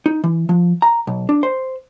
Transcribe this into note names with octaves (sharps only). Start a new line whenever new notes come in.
D#4
E3
F3
A#5
B1
D4
C5